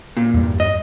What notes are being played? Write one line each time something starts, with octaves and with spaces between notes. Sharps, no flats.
A#2
E2 G2 G3
D#5